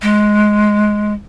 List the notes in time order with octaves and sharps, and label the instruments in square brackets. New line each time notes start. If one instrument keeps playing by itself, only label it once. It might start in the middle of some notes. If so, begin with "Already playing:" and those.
[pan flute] G#3